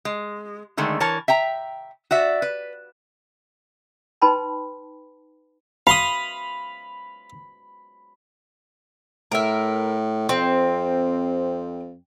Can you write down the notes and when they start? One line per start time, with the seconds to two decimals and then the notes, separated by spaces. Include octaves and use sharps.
0.05 G#3
0.77 D3 D#3 G#3 A3
1.00 E3 A#4 C#5 A5
1.28 E5 G5 A#5
2.11 F#4 D5 E5
2.42 B4
4.22 D#4 B4 G5 A5 B5 C6
5.87 F5 B5 C6 D#6
9.32 A2 A#4 E5
10.29 F2 C4